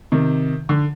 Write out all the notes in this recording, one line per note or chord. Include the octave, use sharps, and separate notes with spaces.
C3 D#3
D3